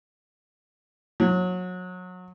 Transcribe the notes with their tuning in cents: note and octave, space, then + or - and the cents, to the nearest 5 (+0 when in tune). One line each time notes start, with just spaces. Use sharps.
F#3 -25